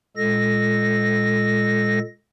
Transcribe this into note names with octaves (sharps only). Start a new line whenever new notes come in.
A#2 G#3 A4 A#6